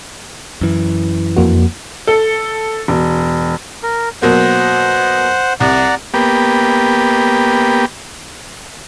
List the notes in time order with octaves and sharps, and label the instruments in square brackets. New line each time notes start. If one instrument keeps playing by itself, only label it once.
[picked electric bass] F#2 E3
[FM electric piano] F2 A#3 F#4
[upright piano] A4
E1
[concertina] A#4
[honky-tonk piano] B2 F#3 A#3 [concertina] C5 F#5
[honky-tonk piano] C2 [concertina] D5 F#5 A#5
[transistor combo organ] A#3 B3 G4